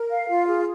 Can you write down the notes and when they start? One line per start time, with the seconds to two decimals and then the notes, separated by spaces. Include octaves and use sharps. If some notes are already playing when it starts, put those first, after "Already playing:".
Already playing: A#4
0.10 F5
0.29 F4
0.49 G#4